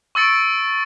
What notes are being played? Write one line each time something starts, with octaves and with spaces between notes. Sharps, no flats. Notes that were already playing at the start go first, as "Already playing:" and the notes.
C#6 E6 A6 C#7 D7